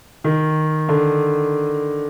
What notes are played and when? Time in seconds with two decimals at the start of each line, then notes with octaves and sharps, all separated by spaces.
0.24 D#3
0.89 D3